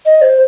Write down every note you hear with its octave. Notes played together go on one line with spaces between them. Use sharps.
D#5
C5